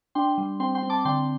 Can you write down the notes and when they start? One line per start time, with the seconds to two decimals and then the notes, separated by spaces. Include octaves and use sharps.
0.15 D4 G5 C6
0.38 G3
0.60 C4 G5 C6
0.75 G5 C6
0.83 C4
0.90 A5 D6
1.05 D3 G5 C6